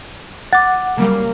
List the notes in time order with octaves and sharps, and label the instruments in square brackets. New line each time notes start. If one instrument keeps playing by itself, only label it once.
[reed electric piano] F#5 [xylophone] D6 A6
[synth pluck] C#3 F#3 G3 [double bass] A#3